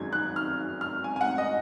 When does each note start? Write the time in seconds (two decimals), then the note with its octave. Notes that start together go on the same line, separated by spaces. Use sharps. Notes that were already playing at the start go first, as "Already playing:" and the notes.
Already playing: G#1 F#2 D#3 G#3 G#6
0.13 F#6
0.36 F6
0.81 F6
1.04 G#5
1.16 G#5
1.21 F#5
1.38 D#5